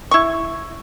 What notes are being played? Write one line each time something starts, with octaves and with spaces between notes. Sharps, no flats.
E4 C#6